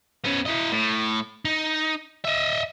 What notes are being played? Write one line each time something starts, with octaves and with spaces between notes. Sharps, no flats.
B3 C#4
E4 D#5
A2
D#4
D#5 E5